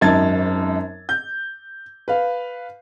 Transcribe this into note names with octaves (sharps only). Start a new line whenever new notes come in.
G#1 F#2 D#4 A5 G#6 A6
G6
B4 F5